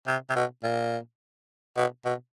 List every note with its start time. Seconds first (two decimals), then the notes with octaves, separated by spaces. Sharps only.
0.07 C3
0.30 C3
0.36 B2
0.63 A#2
1.77 B2
2.05 B2